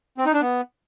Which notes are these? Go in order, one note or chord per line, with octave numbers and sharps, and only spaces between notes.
C4
D#4
D4
B3